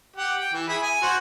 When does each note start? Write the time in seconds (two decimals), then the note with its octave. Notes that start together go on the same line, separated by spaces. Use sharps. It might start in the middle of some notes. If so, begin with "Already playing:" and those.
0.17 G4 F#5
0.40 G5
0.53 E3
0.69 E4 G#4 B5
0.83 G#5
1.02 F#4 C5